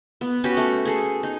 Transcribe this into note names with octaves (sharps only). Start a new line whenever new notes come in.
B3
C#4 F#4 G4 B4
A3
G#4 A4
D#4